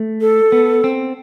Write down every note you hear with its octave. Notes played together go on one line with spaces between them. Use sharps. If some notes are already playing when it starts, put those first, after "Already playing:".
Already playing: A3
A4
B3
C4